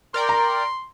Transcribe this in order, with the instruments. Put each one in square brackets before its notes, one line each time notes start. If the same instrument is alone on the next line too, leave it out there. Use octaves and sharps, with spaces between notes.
[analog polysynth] A#4 D5 G5 [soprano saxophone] C6
[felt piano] A#5